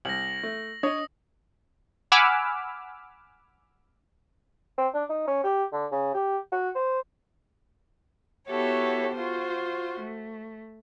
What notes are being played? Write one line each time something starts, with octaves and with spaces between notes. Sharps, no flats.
C2 A#6 F#7
A3
D4 C#5 D#5 D#6
F#5 G#5 B5 D6 E6 F6
C4
D4
D#4
C#4
G4
D3
C#3
G4
F#4
C5
B3 E4 F#4 G4 A4 C#5
F4 F#4 C5
A3